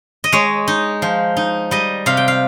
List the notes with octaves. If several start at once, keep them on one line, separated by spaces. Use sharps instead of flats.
D#5
G#3 C#5
D#4
F3
D#4
G3 D#5
C3 F5
G5
F5